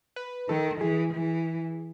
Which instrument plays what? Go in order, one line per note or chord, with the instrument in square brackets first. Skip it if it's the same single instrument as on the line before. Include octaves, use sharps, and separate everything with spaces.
[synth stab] B4
[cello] D#3 [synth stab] A4
[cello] E3 [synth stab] G#4
[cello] E3